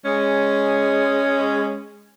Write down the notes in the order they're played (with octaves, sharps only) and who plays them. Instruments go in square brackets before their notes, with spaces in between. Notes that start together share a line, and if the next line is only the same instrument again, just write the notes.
[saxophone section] G#3 C#4